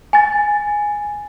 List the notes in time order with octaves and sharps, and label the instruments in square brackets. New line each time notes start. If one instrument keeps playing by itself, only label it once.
[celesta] G#5 A6